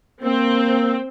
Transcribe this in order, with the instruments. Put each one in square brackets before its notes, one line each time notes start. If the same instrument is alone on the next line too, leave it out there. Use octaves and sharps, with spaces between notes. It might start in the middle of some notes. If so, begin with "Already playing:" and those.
[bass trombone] A#3 [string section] C4